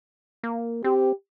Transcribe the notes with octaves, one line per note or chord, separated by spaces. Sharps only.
A#3
C4 G4